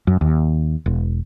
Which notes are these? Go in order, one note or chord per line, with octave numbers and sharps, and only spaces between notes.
F#2
D#2
E1